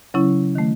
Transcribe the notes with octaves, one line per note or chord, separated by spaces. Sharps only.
C#3 F#3 C#4 E4
D#3 A3